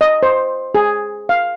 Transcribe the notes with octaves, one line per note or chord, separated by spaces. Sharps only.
D#5
C5
G#4
F5